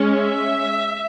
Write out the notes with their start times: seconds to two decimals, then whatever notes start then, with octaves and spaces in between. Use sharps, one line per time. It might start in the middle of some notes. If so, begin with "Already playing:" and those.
Already playing: G#3 C#4
0.16 E5